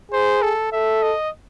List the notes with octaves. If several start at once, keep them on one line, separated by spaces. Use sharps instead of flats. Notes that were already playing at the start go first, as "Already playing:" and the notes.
G#4 C5
A4
A4 E5
D#5